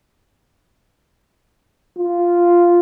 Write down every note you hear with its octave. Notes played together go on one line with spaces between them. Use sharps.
F4